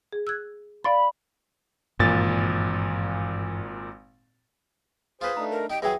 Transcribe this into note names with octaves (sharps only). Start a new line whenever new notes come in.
G#4
E6 F#6 G#6
D5 F5 B5 A6
G#1 G2 A#2 E3 A6
F4 G#4 B4 C5 D#6
A3 D4 D#4 A#5
A#4
G3 D#4 G5
E2 E3 F#3 G#4 E5 G5